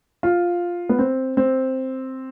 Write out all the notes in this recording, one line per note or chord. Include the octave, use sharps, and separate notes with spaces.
F4
B3
C4
C4